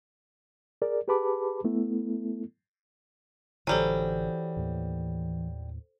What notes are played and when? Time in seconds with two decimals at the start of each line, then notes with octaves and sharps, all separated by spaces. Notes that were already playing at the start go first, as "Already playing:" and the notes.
0.82 G#4 A#4 D5
1.08 G4 G#4 B4 A5 B5 D6
1.64 A3 B3 E4 A4
3.67 A1 D3 E3 F#3 G3 A4 C5 G#5
4.56 D#2 A2 A#3